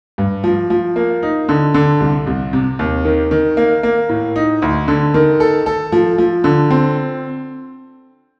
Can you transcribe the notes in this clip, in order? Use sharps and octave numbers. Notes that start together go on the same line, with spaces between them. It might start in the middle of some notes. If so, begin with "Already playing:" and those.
G2
F3
F3
A#3
D#4
D3
D3
C2
C2
C3
D#2
D#3
D#3
A#3
A#3
A2
D#4
D2
D3
D#3
A4
A4
F3
F3
D3
C4